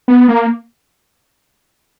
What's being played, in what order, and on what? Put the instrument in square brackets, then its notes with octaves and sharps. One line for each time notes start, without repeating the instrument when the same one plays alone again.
[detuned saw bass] B3
A#3